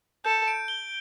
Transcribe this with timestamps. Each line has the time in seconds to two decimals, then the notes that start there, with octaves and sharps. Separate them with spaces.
0.25 A4 G6
0.47 D7
0.68 G7